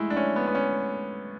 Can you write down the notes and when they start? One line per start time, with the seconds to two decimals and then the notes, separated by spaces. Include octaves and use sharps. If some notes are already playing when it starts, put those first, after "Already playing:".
Already playing: G#3 A3 E4
0.10 D4
0.17 C#4
0.36 B3
0.47 B3
0.55 C#4